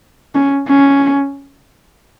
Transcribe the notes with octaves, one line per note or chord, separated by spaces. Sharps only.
C#4
C#4